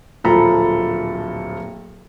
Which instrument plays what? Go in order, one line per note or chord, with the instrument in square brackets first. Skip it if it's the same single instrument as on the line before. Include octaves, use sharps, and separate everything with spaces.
[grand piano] D1 A#2 F3 A4 A#5 B5